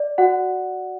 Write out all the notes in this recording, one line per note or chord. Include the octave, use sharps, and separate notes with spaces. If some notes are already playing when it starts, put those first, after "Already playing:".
Already playing: D5
F#4 F#5